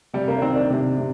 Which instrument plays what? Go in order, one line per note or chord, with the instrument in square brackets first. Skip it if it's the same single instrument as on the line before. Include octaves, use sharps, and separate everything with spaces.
[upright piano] C3 [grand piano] G3
[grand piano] A#3
D4
[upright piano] D#3 [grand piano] C4
[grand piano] D4
[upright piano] C3
C3